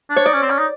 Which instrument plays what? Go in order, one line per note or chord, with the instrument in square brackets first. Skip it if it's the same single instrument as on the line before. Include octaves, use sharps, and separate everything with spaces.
[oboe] D4
[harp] C#5
[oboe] D#4 [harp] D5
[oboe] C#4
C4
C#4
D#4